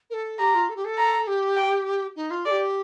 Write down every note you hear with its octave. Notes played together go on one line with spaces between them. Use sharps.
A#4
A4
G4 A#5
F4
A4
G4
A4
A#5
G4
G5
D#4
F4
A4 D5
G4